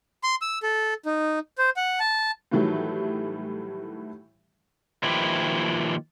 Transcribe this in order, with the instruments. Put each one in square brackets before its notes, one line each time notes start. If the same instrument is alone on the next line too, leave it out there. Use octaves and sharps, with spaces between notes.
[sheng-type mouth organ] C6
E6
A4
D#4
C5
F#5
A5
[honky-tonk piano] A2 D#3 E3 F#3 G3 A3
[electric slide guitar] D#3 F3 A#3 E4 G4 B4